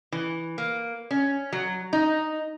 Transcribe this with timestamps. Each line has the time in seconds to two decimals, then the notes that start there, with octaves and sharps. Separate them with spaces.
0.12 E3
0.58 A#3
1.11 C#4
1.52 F#3
1.93 D#4